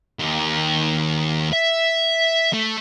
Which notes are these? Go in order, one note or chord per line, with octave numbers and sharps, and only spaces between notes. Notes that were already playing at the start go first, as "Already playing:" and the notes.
D#2
E5
A3